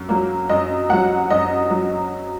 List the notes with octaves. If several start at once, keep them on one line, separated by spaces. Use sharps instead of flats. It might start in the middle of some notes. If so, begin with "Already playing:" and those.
Already playing: F#2
F#3 A#3
F#2 D#5
F#3 A#3 F#5
F#2 D#5
F#3